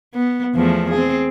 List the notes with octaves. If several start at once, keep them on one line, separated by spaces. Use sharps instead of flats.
B3
E2 F3 A3
C4 G#4